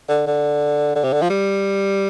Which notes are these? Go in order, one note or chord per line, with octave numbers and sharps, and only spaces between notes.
D3
D3
D3
C3
D3
F3
G3